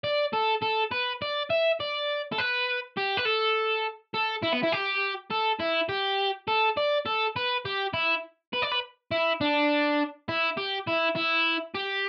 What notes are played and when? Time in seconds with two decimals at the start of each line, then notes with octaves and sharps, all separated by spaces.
0.04 D5
0.33 A4
0.63 A4
0.92 B4
1.22 D5
1.50 E5
1.80 D5
2.32 A4
2.38 B4
2.97 G4
3.17 B4
3.25 A4
4.14 A4
4.42 E4
4.52 B3
4.63 E4
4.72 G4
5.31 A4
5.60 E4
5.89 G4
6.48 A4
6.77 D5
7.06 A4
7.36 B4
7.65 G4
7.94 E4
8.53 B4
8.62 D5
8.72 B4
9.11 E4
9.41 D4
10.29 E4
10.57 G4
10.87 E4
11.16 E4
11.75 G4